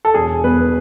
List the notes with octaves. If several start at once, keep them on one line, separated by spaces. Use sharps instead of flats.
A4
E1 G#4
E2 B4